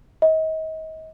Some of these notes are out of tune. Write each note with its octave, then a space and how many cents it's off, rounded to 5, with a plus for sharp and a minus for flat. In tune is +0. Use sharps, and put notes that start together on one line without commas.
D#5 +35